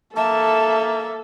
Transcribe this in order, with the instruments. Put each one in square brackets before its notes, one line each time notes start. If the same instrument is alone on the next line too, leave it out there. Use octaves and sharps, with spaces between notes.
[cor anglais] A#3 [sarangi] A4 [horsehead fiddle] E5 [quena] A5